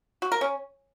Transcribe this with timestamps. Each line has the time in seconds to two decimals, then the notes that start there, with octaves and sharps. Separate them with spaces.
0.22 F#4
0.32 A#4
0.41 C#4